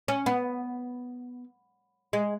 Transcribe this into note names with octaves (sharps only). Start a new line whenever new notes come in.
C#4
B3
G#3